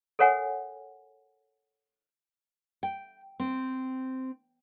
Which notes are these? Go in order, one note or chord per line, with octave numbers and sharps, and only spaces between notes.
A4 A#4 C#5 F#5 G#5
G5
C4